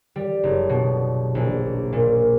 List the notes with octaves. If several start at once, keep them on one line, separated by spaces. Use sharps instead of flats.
G3
F#1
B2
A#1
A#2